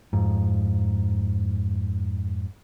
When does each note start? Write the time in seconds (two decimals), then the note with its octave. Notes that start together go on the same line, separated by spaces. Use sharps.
0.13 F2 G#2